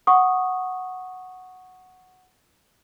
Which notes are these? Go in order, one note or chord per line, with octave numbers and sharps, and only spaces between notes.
F#5 C#6 D#6